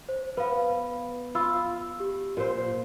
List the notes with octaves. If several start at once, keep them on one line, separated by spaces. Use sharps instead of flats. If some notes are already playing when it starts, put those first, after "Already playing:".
C5
B3 B4 F5
F4 B5 E6
G4
A#2 C5